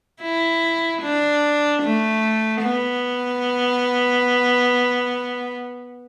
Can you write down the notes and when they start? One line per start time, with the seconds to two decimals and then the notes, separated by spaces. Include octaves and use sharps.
0.22 E4
1.02 D4
1.83 A3
2.62 B3